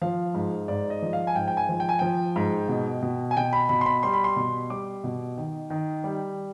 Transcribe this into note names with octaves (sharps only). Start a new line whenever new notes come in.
F3 F5
G#2
G#2 D5
D#5
F3
F5
G#5
G#2 G5
G5
G#5
F3
G5
G#5
F3 G5
G#2
B2
B2
G#5
B2 G5
B5
B2 B5
C6
B5
G3 C6
B5
C6
B2
G3 D6
B2
D#3
D#3
G3